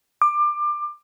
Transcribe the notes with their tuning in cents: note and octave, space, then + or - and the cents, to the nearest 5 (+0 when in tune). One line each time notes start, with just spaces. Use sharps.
D6 +25